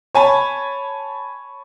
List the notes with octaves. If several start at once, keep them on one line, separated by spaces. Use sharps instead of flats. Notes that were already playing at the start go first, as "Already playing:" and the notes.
C#5 G#5 A5 B5